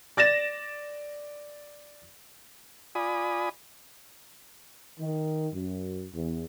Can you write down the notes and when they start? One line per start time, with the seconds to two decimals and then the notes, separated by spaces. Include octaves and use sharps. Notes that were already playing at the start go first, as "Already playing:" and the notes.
0.17 D5 A6 A#6 E7
2.95 F4 D5 G#5 B5 D#6
4.99 D#3
5.53 F#2
6.13 E2